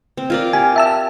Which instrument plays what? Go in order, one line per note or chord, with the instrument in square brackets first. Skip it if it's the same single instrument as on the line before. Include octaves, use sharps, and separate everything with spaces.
[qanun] C4
F4 A#4 D5
[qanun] G4 [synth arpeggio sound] G#5
[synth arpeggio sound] E5 A5 E6